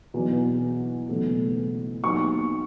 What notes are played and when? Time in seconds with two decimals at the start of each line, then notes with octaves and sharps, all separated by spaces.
0.14 E2 B2 F#3
1.09 F#1 E2 B2 A3
2.03 D#2 D#3 F#3 B3 C#6